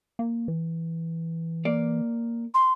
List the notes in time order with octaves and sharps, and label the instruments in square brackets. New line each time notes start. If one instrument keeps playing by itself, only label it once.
[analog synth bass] A#3
E3
[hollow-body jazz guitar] A#3 D5
[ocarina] C6